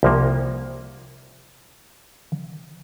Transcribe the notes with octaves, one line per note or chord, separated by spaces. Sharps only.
C2 F3 A#3